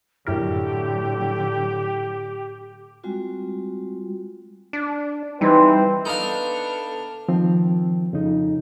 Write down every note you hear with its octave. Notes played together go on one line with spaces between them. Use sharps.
F#2 A2 D3 F#3 E4 G4 A#4
G3 G#3 C4 F4 F#4
D4
E3 G3 C4 D#4 B4
B3 D4 D#4 A4 F5 F6
D#3 F3 C4
F2 C#3 D#4